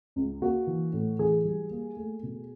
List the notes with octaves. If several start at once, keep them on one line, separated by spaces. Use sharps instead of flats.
C#2
A#3 F#4
E3
A2
E3 G#4
G3
A#3
A3
B2